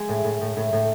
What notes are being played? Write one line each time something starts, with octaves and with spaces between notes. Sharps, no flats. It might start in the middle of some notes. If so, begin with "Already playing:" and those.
Already playing: G#3
A2
A2
A2
A2
A2